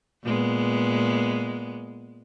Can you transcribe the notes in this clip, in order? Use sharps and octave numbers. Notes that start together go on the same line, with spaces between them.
A#2 G#3 B3